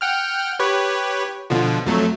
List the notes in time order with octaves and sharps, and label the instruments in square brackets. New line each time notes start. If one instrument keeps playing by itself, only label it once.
[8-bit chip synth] F#5 G5 F6
G4 B4 C#5
B2 D3 F3
F2 F#3 A3